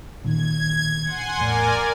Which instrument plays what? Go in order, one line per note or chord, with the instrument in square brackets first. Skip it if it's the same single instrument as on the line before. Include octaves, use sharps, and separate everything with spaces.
[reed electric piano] A#2 D#3 [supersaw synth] G#6
[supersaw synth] F#5 G#5 C6
[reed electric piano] E2 A2 [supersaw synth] A#4 D5 G#5